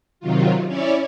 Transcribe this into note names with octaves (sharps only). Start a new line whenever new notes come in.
C3 D#3 F#3 F4
C#4 E4 C#5 D5